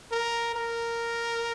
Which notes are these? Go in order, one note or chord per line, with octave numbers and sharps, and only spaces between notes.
A#4
A#4